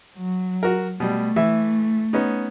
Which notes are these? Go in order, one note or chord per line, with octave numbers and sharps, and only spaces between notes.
F#3
F#4 A#4
B2 G3 A3
E3 E5
B3 C#4 D#4